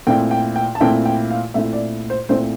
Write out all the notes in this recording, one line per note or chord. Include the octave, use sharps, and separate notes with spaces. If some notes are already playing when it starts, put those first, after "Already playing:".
A#2 A3 C4 E4 G5
G5
G5
A5
A#2 A3 C4 E4 G5
G5
F5
A#2 A3 C4 E4 E5
D5
C5
A#2 A3 C4 E4 C5